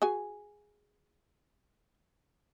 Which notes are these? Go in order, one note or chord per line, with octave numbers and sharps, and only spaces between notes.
F#4 G#4 G#5